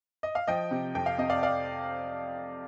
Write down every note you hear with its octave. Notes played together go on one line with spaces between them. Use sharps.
D#5
F5
F3 D#5 G5
C3
F2 G5
F5
C3 D#5
D5 F5
D5 F5